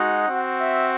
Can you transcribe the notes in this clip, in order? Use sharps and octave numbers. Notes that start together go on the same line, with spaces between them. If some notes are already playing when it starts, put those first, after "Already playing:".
Already playing: G#3 D#4 F#4 F#5
C4 F#4
E5